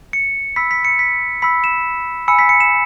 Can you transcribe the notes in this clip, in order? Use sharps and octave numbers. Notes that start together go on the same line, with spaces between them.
C#7
B5 E6 B6
B6
C#7
B6
B5 E6 B6
E7
G#5 B5 E6 C#7
B6
C#7
E7